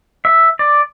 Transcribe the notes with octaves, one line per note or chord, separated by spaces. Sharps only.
E5
D5